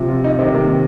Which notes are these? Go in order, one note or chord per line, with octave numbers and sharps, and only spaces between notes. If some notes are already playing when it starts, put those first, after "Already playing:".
Already playing: C3 F3
F4
D#4
C3 D#3 C4
A#3